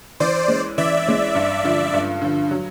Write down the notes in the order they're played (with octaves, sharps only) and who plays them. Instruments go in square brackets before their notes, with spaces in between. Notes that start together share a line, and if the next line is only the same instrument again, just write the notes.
[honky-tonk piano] E3 [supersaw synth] C5 D5
[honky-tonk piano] G#3 C#4
[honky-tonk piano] E3 [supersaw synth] D5 E5
[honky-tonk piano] G#3 C#4
G2
D3 F3
G2
D3 F3
F#3